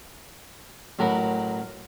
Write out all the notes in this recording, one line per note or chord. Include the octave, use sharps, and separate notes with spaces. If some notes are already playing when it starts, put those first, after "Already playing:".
A1 F#3 A#4 F#5 B5